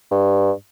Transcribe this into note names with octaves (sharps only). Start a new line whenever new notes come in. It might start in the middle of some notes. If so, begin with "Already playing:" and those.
G2